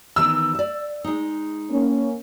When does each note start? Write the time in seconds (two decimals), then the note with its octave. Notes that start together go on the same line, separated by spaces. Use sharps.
0.16 D#3 E3 B3 E6
0.55 D5 E5
1.04 G#3 D#4
1.71 A#3 C#4